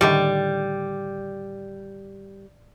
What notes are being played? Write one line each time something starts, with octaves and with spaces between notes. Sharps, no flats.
A2 D3 D#3 G3